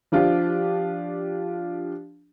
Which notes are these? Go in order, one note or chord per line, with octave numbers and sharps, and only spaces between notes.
F3 D4 F4 G4